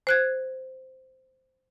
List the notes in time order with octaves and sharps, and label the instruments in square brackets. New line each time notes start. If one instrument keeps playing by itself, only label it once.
[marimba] C5 F#6 G#6